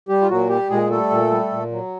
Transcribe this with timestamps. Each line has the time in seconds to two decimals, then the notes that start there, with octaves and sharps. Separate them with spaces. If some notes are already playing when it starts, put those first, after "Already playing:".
0.09 G3 G4
0.21 F4
0.29 A#2 F#3 F#4
0.49 G3 G4
0.70 A#2 G#3 G#4
0.90 G3 A3 A4
1.11 A#2
1.31 G3
1.51 A#2
1.71 F#3